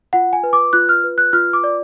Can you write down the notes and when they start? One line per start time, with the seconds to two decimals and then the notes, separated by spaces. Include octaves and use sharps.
0.13 F4 F#5
0.33 G#5
0.43 B4
0.53 D6
0.73 F4 F#6
0.89 F6
1.04 B4
1.18 F#6
1.33 F4 F6
1.53 D6
1.64 D5